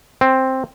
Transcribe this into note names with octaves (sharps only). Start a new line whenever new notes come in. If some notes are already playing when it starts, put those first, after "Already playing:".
C4